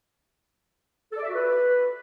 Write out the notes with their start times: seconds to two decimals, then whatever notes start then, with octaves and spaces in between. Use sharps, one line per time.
1.12 A4
1.17 D5
1.23 E5
1.28 F#4
1.34 B4